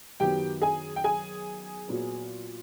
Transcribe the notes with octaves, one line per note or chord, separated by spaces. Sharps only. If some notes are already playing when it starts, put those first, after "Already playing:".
F#2 D#3 F#3 B3 G4 G5
G#4 G#5
G5
G#4 G#5
A#2 F#3 B3